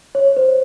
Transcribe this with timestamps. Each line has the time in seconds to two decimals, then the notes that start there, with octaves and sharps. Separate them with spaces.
0.15 C#5
0.37 C5